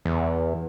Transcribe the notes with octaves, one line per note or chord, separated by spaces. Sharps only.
E2